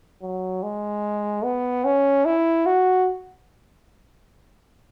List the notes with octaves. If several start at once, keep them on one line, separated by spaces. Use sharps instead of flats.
F#3
G#3
B3
C#4
E4
F#4